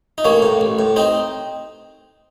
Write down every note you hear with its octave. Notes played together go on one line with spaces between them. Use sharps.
D#4
A1 A#3 C#4
A2
A1
A2
C4 D#4